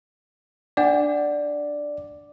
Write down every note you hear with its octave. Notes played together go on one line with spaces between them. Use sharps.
D4 D5 F#5